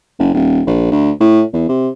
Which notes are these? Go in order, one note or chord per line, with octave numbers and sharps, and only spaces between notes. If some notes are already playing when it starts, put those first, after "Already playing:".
F#1
D#1
A#1
D2
A2
E2
C3